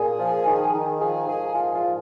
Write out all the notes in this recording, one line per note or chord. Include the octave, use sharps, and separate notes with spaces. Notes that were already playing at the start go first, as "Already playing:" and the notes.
Already playing: A#2 G#4
F3
D#3
D#3
F3 G#4
G#2 G#4
A#2 F4
F4
F3